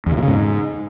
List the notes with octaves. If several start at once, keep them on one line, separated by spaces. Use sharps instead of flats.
E2
D3
A#2
C#3
G#2